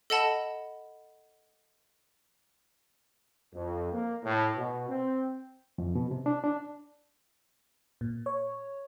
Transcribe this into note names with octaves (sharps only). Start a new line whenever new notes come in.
A4 D#5 F#5 A5 B5
F2
A#3
A2
B2
C4
F2
B2
C3
D4
D4
A#2
C#5